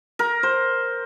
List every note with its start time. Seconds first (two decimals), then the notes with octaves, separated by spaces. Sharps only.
0.19 A#4
0.43 C5